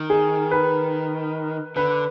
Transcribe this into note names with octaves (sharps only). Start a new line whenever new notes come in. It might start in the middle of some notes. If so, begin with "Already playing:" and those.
Already playing: D#3
G#4
B4
D3 B4